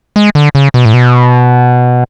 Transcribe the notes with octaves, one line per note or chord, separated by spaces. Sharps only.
G#3
D3
C#3
B2
A2
B2